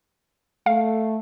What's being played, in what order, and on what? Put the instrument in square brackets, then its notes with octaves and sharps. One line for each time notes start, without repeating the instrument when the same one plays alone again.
[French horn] A3 [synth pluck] F5